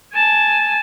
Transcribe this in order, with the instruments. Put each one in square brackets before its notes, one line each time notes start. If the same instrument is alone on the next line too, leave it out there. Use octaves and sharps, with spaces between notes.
[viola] G#5 A5